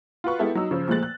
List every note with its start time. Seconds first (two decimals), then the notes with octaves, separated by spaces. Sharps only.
0.24 F4 F#4 B4 C#6
0.39 G#3 B3 E4 G4 A4 E5
0.55 F#3 D#4 E6
0.71 C#3 F3
0.88 A#2 F3 G#3 A3 F#6 A6
1.03 F#6